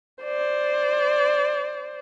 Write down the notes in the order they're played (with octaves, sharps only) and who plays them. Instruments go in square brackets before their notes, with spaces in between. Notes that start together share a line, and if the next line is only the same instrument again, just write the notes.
[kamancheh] C5 D5